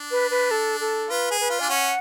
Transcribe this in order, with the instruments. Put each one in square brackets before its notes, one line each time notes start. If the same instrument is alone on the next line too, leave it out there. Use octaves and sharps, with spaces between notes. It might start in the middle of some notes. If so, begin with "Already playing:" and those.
Already playing: [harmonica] D4
[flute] B4
B4
A4
A4
[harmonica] F4 [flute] B4
[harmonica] G#4
[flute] B4
[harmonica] F4
[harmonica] D4 [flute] G#5
[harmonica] C#4 [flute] F#5